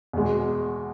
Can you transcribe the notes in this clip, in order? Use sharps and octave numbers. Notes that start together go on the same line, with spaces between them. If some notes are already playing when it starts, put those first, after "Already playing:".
E2 B2 G#3